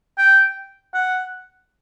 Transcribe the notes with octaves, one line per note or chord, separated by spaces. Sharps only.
G5
F#5